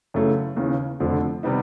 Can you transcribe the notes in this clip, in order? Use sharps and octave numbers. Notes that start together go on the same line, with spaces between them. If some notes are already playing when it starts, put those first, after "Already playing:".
F#2 C#3 E3 A3
D#2 C#3 E3
F1 F2 D3 F3
C3 D#3 G3 B3 D#4